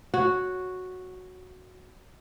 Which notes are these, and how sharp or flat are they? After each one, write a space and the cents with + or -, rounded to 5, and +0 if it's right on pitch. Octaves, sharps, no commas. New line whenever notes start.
F#4 -5 C#5 +0